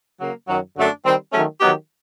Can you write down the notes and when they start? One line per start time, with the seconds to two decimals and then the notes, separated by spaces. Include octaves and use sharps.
0.18 C#3 F#3 A#3
0.47 F#2 D#3 F#3
0.76 F#2 D3 F#3 A3 D4
1.03 D#3 G3 C4
1.32 D#3 F#3 A3 C#4
1.60 D#3 F#3 B3 D#4 G4